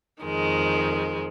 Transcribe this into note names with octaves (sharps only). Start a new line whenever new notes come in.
F2 D#3 G#3